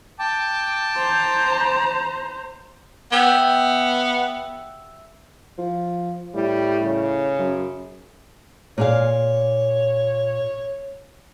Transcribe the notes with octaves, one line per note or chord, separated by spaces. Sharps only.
G5 A5 D6
C5 A#5
B3 G4 E5
F3
A2 G3
C#3
F#2
A#2 G#4 C#5 F5